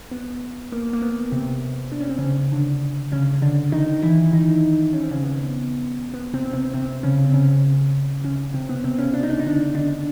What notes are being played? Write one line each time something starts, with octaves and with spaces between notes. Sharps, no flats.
B3
A#3
A#3
B3
C3 C4
D4
C#4
C4
C#3 C#4
D3 D4
C#3 C#4
D3 D4
D#3 D#4
E3 E4
D#3 D#4
C#4
C4
C#3 C#4
B3
B3
C3 C4
C3 C4
C3 C4
C#3 C#4
C4
C#3 C#4
C#3 C#4
C3 C4
B3
C3 C4
C#3 C#4
D4
D#4
D4
D#4
D3 D4
D3 D4